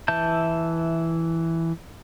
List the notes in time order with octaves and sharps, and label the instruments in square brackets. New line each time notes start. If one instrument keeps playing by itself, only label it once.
[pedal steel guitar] E3 E5 A5 G6